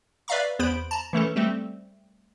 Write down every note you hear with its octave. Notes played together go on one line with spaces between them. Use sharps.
B4 D5 E5 F5 A#5 C#6
E2 B3 C5 B5 D7
A5 A#5
E3 A3 C#4 A4
G3 A3 C4